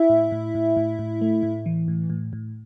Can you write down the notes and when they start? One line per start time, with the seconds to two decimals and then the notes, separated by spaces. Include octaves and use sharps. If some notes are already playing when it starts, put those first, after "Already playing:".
Already playing: E4 E5
0.10 A2
0.32 A2
0.55 A2
0.77 A2
0.99 A2
1.21 A3
1.43 A2
1.66 E3
1.88 A2
2.10 A2
2.33 A2